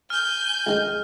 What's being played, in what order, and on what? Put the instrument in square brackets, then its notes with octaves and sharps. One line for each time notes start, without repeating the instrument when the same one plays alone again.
[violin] G#5 G6 [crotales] F6
[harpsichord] C#2 D#3 G#3